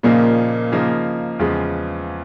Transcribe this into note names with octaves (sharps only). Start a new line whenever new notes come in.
A#2 C#3 F3 A#3 D#4
C#3 F3 A#3 D#4
E2 C#3 F3 G#3